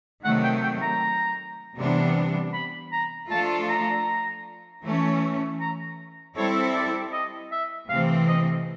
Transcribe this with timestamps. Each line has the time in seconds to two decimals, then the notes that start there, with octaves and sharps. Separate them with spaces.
0.25 C3 D#3 F#3 A3 F#5
0.44 G5
0.63 G5
0.82 A#5
1.77 C3 E3 G3 B3 D4
2.54 B5
2.92 A#5
3.30 F3 A3 D4 F4 A4 A5
3.69 A#5
4.84 E3 A3 C#4
5.61 A#5
6.36 G3 C4 E4 A4 C#5
6.75 D5
7.13 D#5
7.52 E5
7.89 C3 E3 A3 C4 F5
8.29 D#5